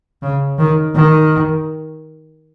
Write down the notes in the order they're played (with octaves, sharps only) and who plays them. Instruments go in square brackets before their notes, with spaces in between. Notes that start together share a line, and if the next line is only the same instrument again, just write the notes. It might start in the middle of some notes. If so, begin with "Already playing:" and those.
[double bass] C#3
D#3
D#3